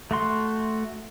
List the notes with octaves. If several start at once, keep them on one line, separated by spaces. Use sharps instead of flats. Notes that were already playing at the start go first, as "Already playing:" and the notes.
A3 F#4 C6